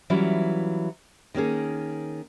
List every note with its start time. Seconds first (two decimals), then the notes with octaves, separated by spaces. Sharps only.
0.10 E3 F#3 G3 C#4 E4 F4
1.34 D#3 A#3 C#4 G#4